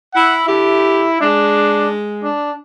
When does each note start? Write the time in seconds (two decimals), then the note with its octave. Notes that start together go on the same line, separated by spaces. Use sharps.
0.14 E4 F#5
0.46 D3 E4 G4
1.21 G#3 D4
2.24 D4